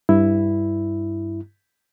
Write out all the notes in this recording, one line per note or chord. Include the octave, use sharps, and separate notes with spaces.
G2 E4